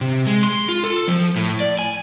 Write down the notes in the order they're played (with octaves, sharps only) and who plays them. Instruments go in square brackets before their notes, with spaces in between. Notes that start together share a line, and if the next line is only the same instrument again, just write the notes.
[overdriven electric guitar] C3
G#3
C6
F4
A4
F3
A2
D5
G#5